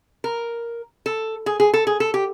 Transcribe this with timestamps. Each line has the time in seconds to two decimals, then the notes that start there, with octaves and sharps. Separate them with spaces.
0.24 A#4
1.06 A4
1.46 G#4
1.60 G#4
1.74 A4
1.87 G#4
2.00 A4
2.14 G4